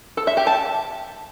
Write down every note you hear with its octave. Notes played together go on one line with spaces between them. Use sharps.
A4
E5
G4
A5